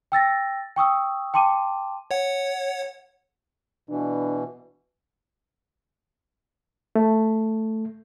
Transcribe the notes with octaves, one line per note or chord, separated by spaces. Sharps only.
G5 E6 A6 A#6
G5 C#6 D#6 E6
G5 A5 C6 D6 D#7
C#5 F#5
B2 E3 D4
A3